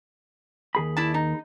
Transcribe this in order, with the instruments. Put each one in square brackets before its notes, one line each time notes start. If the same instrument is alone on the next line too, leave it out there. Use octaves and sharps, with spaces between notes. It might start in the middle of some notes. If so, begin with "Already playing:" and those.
[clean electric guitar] D#2 G#4 B5
[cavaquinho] E4 D5 A5
D#4